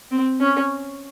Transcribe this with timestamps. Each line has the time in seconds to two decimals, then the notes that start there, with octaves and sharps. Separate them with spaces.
0.11 C4
0.41 C#4